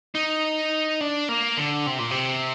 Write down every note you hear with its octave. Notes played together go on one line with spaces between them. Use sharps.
D#4
D4
A#3
D3
C3
A#2
C3